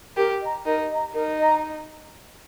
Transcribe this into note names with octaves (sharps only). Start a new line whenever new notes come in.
G4 A#4
D#5 A#5
D#4 A#4
D#5 A#5
D#4 A#4
D#5 A#5